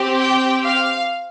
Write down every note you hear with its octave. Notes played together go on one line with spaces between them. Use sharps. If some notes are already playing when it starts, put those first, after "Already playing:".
Already playing: C4 G4
G5
F5